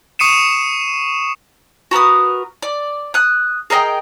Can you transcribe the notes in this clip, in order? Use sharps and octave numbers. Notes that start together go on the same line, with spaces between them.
C#6 D#6 C7 C#7 D#7 E7
F#4 A#4 B4 D#6
D5
D#6 F#6
G#4 A#4 D#5 G5